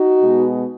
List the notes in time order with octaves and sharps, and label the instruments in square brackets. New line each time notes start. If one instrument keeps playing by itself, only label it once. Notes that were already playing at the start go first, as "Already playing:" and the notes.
Already playing: [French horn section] D#4 F#4
B2 G#3 B3